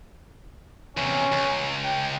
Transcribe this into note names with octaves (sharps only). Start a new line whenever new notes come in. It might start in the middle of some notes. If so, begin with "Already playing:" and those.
E2 C3 C#4
C#2
G5